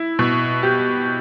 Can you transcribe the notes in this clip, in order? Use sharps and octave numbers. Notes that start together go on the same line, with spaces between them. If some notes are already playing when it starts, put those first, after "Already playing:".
Already playing: E4
B2
G4